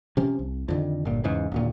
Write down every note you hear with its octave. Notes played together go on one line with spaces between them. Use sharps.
C3 F3 C#4
C2
F2 D3 D#3
G1 A#2
E2 G#2 C#3
D#1 D2 A#2